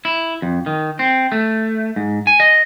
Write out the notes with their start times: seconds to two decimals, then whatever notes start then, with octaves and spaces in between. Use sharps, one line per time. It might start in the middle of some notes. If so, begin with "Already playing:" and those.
0.05 E4
0.42 F2
0.66 D#3
0.99 C4
1.32 A3
1.96 G#2
2.27 G#5
2.40 D#5